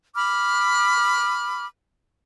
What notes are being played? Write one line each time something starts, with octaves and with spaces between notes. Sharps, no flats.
B5 D6 F6